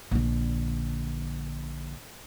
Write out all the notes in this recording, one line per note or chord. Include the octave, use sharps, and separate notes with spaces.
A#1 D3